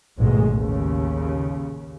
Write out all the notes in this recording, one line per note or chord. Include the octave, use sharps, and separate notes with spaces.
A1 D#2 G#2 B2 G#3
D#2 C#3